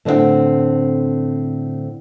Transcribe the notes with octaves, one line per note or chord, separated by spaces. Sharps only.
A2 D3 C4 D#5 F#5 G5